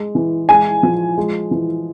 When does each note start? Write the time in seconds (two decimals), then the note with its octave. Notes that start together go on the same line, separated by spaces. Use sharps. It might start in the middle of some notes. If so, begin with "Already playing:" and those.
Already playing: G#3
0.15 E3
0.49 G#3 G#5
0.83 F3
1.17 G#3
1.51 E3